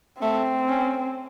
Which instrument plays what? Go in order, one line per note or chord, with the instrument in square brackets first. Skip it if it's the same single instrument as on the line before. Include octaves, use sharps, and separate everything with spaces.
[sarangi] A3 [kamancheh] C4
[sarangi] C#4